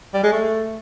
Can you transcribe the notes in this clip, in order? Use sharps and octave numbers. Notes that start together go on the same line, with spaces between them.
G3
G#3
A3